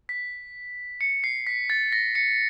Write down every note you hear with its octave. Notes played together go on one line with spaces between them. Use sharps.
B6
C#7
C7
B6
A6
A#6
C#7